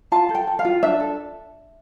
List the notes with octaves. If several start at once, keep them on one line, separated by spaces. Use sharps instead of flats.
F4 A5
A4
G5
A4
F5
F4
D4 E5
A4